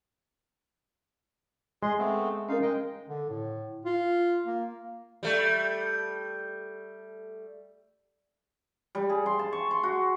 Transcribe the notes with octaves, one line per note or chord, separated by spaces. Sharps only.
G#3 G#4 C6
A3 B3 C4
C#4 D#4 A#4 F5
G#3 D#5 G5
D3
A2
F4
A#3
G3 A3
G3
G#4
C6
A5
C#6
C6
F#4